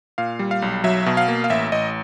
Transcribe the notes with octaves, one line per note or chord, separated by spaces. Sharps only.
A#2 F5
G3
F5
B1
F#3 E5
B2
F5
A#3
F5
A1 E5
A1 D#5